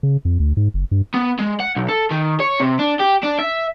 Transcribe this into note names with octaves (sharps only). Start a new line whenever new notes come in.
C#3
F2
D2
G#2
F#1
G2
B3
G#3
F#5
B1
A4
D#3
C#5
C3
D4
G4
D4
E5